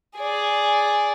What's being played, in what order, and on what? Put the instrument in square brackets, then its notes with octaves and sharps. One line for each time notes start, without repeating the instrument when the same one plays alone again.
[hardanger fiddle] G#4 D5